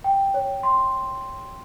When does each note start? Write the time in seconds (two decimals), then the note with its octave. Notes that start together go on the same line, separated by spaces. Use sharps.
0.04 G5
0.34 C#5
0.63 C6